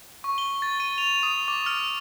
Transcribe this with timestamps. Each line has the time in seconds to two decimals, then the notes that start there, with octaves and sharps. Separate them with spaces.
0.24 C#6
0.38 G7
0.62 A6
0.80 D#7
0.98 F7
1.23 D#6
1.48 D6
1.66 F6